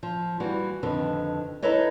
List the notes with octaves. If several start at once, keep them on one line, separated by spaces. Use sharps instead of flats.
F3
E3 G3 F#4
F2 D3 D#3 B4
D#4 E4 A4 B4 C#5 D#5